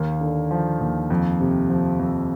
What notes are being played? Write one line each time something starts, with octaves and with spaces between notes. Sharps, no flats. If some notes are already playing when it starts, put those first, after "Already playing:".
Already playing: D#2 A#3
D3
F3
D#2
F2
C3
F3
F2